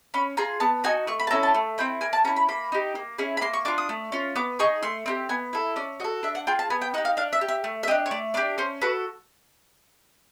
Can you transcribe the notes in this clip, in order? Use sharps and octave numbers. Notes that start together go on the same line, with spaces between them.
C#4 B5
F4 G#4 A#5
B3 A5
D#4 F#4 G#5
A3 C#6
B5
A5
C#4 E4 A4 A#5
A5
A3
C4 E4 G5
A#3 G#5
A5
C#4 E4 A#5
B5
A#3 B5
D#4 G4
A#3
C#4 E4 G#4
B5
A#3 C6
C#6
D4 F4 D6
D#6
A3
C#4 F4
B3 D6
D#4 G#4 C#6
A3 C6
C4 D#4 G4
B3 G#5
E4 A4
C#4 D5
F#4 A4 D#5
D4 E5
F#5
F4 G#4 G5
A5
B3 G#5
G5
D#4 G4 F#5
F5
D4 F5
E5
G4
E5
A3
E5
D4 G4 D#5
C#5
A3 D5
D4 G4 D5
C#4 C5
F#4 A4 B4